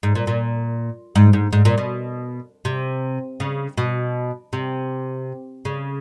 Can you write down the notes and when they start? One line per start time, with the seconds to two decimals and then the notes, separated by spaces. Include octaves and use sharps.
0.03 G#2
0.15 A#2
0.27 A#2
1.15 G#2
1.33 G#2
1.53 G#2
1.65 A#2
1.78 B2
2.65 C3
3.40 C#3
3.78 B2
4.53 C3
5.65 C#3